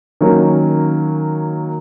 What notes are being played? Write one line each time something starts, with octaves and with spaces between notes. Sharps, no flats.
D#3 F#3 A#3 C#4